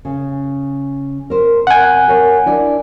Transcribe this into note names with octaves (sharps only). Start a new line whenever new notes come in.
C#3
A#4 C5
C3 F#5 G#5
A#4 C#5
D4 E4 D5